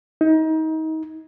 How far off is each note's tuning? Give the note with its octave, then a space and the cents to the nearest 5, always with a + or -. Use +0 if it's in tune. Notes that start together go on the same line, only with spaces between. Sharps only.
D#4 +30